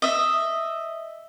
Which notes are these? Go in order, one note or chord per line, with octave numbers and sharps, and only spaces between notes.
D#5 E5